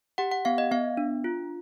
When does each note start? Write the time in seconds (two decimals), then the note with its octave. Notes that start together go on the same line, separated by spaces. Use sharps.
0.18 G4 F#5
0.32 F#5
0.45 B3 F5
0.58 D#5
0.71 B3 F5
0.97 D4
1.24 F4